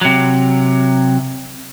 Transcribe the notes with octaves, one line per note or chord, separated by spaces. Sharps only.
C3 F#3